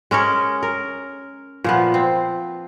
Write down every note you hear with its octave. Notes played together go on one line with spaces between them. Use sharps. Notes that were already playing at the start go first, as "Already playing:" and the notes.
G#3 C#4 A#4 C#5
A#4
A#2 F3 B3
C4